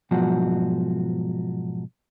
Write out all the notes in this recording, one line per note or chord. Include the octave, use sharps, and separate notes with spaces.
G#2 B2 F3 F#3 F#4